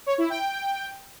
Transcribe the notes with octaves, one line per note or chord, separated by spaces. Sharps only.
C#5
E4
G5